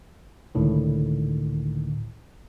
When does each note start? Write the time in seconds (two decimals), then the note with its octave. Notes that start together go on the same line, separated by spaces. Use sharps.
0.55 C#2 A2 D3 D#3